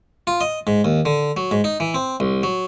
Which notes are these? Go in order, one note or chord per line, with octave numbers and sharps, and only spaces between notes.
F4
D#5
G#2
D#2
D3
F#3
G#2
D#4
E3
C4
C2
F#3